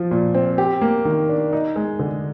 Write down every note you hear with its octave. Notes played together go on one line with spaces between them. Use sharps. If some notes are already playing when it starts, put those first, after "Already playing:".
Already playing: F3 F4
A#2
C4
G4
A#3
D#3
D4
D#4
G#3
D3